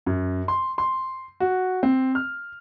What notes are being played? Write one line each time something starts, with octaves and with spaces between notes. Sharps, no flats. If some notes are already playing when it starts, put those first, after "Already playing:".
F#2
C6
C6
F#4
C4
F6